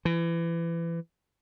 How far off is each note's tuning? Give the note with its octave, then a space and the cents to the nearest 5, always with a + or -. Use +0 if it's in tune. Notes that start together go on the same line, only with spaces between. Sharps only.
E3 +25